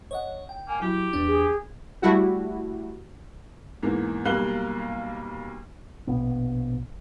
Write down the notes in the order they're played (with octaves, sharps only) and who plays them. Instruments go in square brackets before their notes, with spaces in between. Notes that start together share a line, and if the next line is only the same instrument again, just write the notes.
[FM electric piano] C#5 D#5 F#5
G5
[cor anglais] A#3 [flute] G#5
[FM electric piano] F#3 [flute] E4 [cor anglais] G4
[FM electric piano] E2 D4
[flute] G#4
[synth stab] G3 A3 E4 F#4
[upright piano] E2 G#2 E3 A#3
B1 G3 A#3 F5 F#6 G7
[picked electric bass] A#1 B2 B3